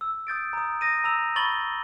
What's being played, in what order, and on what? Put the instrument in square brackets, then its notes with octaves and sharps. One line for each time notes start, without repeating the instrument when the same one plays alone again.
[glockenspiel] E6
D#6 G6 A6 D7
A#5 D#6
D#6 A#6 D#7
A#5 E6 F7
B5 C#6 A6 F#7 G7